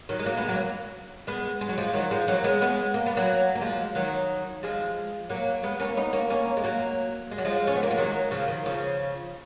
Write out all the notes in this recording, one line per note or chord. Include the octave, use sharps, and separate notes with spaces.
D#3 F#3
G#3
F#3 A#3
G#3 B3
F#3 A#3
G#3 B3
G#3
F#3
F3 G#3
D#3 F#3
F3 G#3
F#3 A#3
G#3 B3
G#3 B3
A#3
B3
F#3 A#3
A#3
F3 G#3
D#3 F#3
F3 G#3
F#3 A#3
G#3 B3
A#3 C#4
B3 D#4
A#3 C#4
A#3 C#4
G#3
F#3 A#3
G#3
F#3
F3 G#3
C#4
B3
A#3
G#3
D#3 F#3
C#3 F3
D#3
C#3 F3